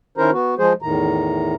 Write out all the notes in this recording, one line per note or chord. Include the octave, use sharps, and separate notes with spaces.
D#3 C#4 E4 A#4 C5 A#5
B3 F#4
F3 G#3 G#4 C5
E2 A2 D#3 A#5